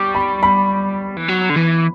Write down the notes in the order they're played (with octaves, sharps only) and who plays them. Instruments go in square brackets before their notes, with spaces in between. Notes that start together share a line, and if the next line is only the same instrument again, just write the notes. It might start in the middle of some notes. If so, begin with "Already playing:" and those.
Already playing: [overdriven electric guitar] G3 [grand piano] C#6 D6
[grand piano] B5
B5
[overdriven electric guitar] E3
F#3
D3
E3